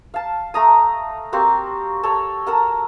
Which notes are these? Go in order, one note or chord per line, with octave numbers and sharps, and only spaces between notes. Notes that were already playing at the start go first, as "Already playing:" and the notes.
F5 A5
A3 A#5 D#6
A#3 C4 F#4 G4
A4 C#5
A4 A#4 F#5